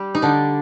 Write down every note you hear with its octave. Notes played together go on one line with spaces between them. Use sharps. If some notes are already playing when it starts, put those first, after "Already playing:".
Already playing: G3 G4
D#4
D3 D4